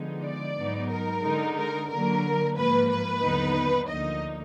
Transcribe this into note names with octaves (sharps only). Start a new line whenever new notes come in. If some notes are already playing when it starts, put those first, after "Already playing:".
Already playing: D3 F3 G#3 B3 D#4
D5
G#2 F#3 B3 D#4
A#4
D3 G#3 D#4
A#4
D3 F#3 A#3 A#4
G#2 F3 A#3 B4
B4
D#2 D3 F#3 B3 D#4
D2 D3 F3 A#3 D#4 D#5